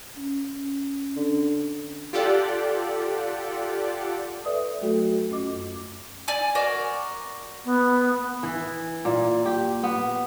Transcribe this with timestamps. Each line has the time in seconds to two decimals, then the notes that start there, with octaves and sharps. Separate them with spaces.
0.17 C#4
1.16 D3
2.13 F4 G4 A4 D5 F#5
4.45 A4 B4 D5 E5 D#6
4.81 F#3 A3 F#4 A4
5.30 F#2 C#4 D#5 D6
6.28 D5 G#5 D6
6.55 F#4 A#4 D5
7.65 B3
8.43 E3
9.05 A#2
9.46 G4
9.83 B3